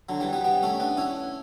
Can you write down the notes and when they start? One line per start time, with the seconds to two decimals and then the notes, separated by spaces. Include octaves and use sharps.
0.09 D3 F#3
0.20 E3 G3
0.33 G3 B3
0.44 G3 B3
0.63 A3 C#4
0.80 B3 D4
0.97 C#4 E4